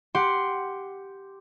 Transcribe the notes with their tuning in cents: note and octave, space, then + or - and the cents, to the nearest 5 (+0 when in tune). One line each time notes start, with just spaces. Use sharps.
G4 +0 F#5 +0 C6 +0